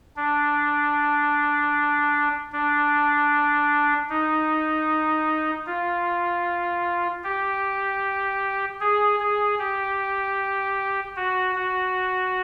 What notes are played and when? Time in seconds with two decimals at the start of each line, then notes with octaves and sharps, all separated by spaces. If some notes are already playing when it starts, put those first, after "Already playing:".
0.16 D4
2.52 D4
4.09 D#4
5.66 F4
7.24 G4
8.81 G#4
9.20 G#4
9.59 G4
11.16 F#4
11.55 F#4